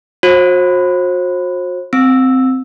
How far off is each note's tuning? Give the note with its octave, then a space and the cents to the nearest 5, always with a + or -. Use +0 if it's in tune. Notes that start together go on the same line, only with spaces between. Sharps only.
F#4 -35 C5 +35
C4 -10 E6 -5